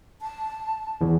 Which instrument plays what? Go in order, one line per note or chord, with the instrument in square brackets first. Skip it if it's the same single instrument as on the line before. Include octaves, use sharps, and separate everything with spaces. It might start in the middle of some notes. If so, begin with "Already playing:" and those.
[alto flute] A5
[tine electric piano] E2